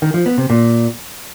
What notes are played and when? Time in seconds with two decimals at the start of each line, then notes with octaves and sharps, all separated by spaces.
0.02 D#3
0.14 F3
0.26 B3
0.38 C3
0.50 A#2